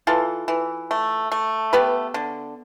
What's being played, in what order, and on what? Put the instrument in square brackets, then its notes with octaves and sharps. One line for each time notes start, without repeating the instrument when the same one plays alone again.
[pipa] E3 F4 A4
E3
A3
A3
B3 G4 B4
D3